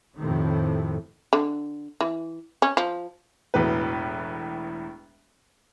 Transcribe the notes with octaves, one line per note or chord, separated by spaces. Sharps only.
F2 A2 C3 D#3
D3
E3
C#4
F3
E1 E2 A2 B4